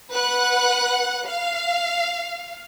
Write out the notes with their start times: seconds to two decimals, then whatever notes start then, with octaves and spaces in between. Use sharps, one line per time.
0.11 B4 F#5 F#6
1.26 F5